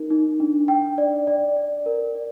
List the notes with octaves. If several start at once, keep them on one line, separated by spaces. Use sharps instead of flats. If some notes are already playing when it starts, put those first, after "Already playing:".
Already playing: D#4 A#4
D#4
D4
G5
D5
D5
D5
A#4
D5